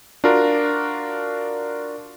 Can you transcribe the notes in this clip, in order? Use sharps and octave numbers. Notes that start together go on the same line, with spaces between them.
D4 F4 F#4 A#4